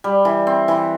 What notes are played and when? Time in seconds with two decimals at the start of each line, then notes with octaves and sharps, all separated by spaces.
0.04 G3
0.25 E3
0.47 C4
0.68 E3